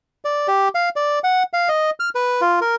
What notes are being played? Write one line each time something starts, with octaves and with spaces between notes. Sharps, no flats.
D5
G4
F5
D5
F#5
F5
D#5
F6
B4
F4
A#4